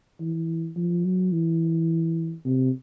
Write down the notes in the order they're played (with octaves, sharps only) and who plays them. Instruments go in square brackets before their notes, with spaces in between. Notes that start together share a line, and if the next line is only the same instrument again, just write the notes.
[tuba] E3
F3
F#3
E3
C3